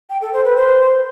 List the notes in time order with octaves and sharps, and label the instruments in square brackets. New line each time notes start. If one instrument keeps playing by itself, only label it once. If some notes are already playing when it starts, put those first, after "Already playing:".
[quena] G5
A4
C5
B4
C5